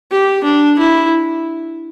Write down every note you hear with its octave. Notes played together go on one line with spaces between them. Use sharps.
G4
D4
E4